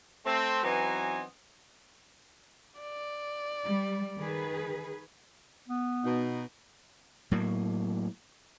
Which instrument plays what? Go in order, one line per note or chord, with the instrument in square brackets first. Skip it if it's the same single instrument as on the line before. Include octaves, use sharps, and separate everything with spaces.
[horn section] A3 C4
E3 F#3 B3 C4 D#4 G#5
[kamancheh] D5
[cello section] G3
D#3 G#4 B4
[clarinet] B3
[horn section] B2 D#4
[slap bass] A2 F#3 A#3